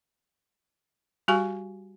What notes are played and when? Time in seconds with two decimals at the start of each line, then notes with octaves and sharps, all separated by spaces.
1.28 G3 F#4 G4 G#5 C#6